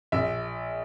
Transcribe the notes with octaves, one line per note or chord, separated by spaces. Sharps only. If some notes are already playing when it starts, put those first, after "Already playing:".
A#1 E5